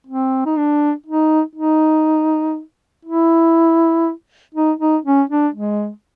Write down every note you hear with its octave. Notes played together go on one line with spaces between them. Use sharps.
C4
D#4
D4
D#4
D#4
E4
D#4
D#4
C#4
D4
G#3